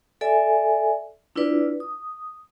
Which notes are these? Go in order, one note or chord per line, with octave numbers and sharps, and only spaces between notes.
A4 D5 E5 G#5
D4 E4 F4 B4 D5
D#6